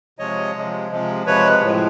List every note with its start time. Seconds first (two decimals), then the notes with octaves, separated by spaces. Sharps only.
0.19 C3 F3 G#3 C#5 D#5
0.56 C3 F3 G#3
0.91 C3 F3 G#3
1.26 C3 F3 G#3 B4 C#5
1.63 A2 F3 G#3